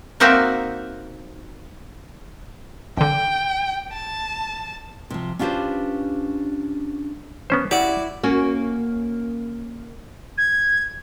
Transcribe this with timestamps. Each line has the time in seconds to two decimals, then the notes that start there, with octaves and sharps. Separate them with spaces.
0.20 A#3 C4 D#4 F#4 E5 F5
2.97 G#1 D3 G5
3.93 A5
5.10 C3 F3
5.39 C#4 D4 F4 G4 B4 C5
7.50 B3 C#4 C5
7.71 E4 F#4 G4 D5
8.24 A#3 C#4 F#4
10.38 G#6